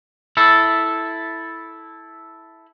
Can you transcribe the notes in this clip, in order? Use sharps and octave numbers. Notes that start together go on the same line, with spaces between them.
E4 A4